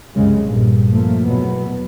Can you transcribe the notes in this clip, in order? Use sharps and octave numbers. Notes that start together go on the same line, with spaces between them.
C2 F#2 C#3 G#3
A#1 G2 A#2
F3 A3 A#3
E2 B2 F#3 B3